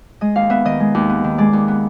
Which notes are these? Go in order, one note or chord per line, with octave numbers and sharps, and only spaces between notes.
G#3 D#5
D#2 F5
B3 E5
D#3 D#5
G#3
D#2
B3
D#3
G#3 D5
D#2
B3